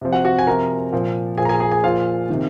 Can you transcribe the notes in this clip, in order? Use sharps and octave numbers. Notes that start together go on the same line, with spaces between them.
C3 F3
F#4 F#5
F#4 F#5
G#5
C3 F3 A#4 A#5
A#2 F3
A#2 F3 G#4 G#5
A#5
G#4 G#5
G#4 G#5
G#4 G#5
A#2 F3 F4 F5
C3 D#3